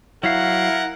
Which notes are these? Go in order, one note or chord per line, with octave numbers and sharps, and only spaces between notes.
F#3 E4 A#4 F5 F#5